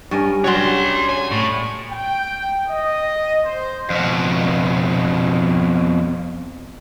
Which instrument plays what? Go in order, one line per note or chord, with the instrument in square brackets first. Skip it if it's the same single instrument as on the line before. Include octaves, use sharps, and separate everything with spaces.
[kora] G2 C#4 A#4
[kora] F#3 G3 F#4 [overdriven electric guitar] C#5 C6
[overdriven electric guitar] G#5
A2
[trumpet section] G5
D#5
C5
[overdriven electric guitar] F2 B2